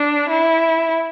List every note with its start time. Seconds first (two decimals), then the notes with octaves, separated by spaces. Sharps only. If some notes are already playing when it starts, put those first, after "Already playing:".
Already playing: D4
0.28 E4